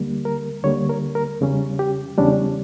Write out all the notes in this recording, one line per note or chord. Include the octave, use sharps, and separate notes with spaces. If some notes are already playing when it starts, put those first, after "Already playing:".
Already playing: D2 D3 G3 A#3
A#4
D2 D3 G3 A#3 C#5
A#4
A#4
E2 C#3 G3 C#4
G4
E2 C#3 G3 C#4 D4